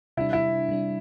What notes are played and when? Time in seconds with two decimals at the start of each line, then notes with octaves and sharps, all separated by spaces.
0.17 C3 G3 D4 E4
0.33 E4
0.69 C3 G3 D4